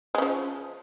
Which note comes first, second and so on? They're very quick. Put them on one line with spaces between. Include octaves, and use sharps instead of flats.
G#3 C#3 F3